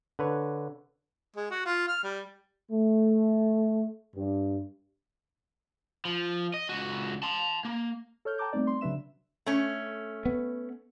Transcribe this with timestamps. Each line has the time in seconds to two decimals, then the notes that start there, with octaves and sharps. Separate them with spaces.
0.19 D3 B4 C#5
1.36 G#3
1.51 F#4
1.66 F4
1.88 F6
2.04 G3
2.72 A3
4.16 G2
6.05 F3
6.54 D#5
6.69 C#2 F#4
7.23 A5 C6
7.65 A#3
8.25 A4 C#5 F6 G6
8.38 G5 A5 A#5 D6 G6
8.53 G3 A3 B3 C4 D#4 D5
8.67 C6
8.81 C#3 F#3 D4 B4 E5 E7
9.46 A3 C#4
10.25 B3